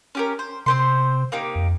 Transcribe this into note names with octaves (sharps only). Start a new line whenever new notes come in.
C#4 G4 A#4
C5
C3 C4 C5 C6
A#3 D#4 G4
F2